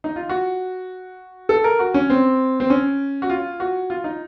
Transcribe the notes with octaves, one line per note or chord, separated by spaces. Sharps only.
D#4
F4
F#4
A4
A#4
F#4
C#4
C4
C4
C#4
F#4
F4
F#4
F4
D#4